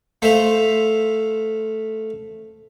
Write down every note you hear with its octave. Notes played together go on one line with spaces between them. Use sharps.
A3 C5 E5 F5